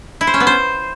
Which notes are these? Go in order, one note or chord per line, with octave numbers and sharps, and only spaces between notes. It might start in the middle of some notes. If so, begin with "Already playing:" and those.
E4
C5
C#4
B3
C5